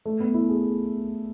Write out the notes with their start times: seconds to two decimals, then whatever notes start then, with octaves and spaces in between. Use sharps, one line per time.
0.05 A3
0.20 B3
0.34 E4
0.49 G#4